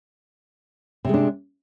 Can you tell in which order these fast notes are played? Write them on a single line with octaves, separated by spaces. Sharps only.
C3 G#3 D4